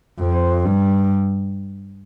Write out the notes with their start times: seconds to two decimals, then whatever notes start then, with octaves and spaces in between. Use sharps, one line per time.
0.20 F2
0.65 G2